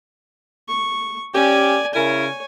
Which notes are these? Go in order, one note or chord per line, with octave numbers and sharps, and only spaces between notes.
C#6
C#4 G4 D5 G#5
C#3 E4 A#4 C#5 G#5